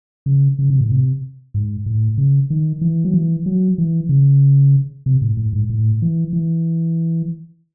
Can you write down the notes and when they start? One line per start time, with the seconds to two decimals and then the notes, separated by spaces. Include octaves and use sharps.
0.26 C#3
0.59 C#3
0.70 C3
0.81 A2
0.92 C3
1.54 G#2
1.86 A2
2.18 C#3
2.50 D#3
2.81 E3
3.05 F#3
3.14 E3
3.46 F#3
3.78 E3
4.09 C#3
5.06 C3
5.22 A2
5.37 A2
5.53 G#2
5.69 A2
6.02 E3
6.33 E3